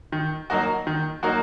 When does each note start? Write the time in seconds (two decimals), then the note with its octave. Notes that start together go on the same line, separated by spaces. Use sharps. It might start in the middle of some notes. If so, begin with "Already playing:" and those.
0.12 D#3
0.50 F#3 A#3 D#4 F#4
0.87 D#3
1.23 F#3 A#3 D#4 F#4